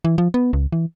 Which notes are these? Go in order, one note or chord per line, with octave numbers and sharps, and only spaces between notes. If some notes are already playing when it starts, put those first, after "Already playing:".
E3
F3
B3
C#2
E3